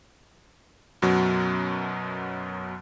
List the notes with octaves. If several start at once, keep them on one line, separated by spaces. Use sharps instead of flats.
F#2 B2 F#3